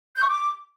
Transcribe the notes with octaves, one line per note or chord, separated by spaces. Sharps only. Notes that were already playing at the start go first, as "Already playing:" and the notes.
G6
C#6
D6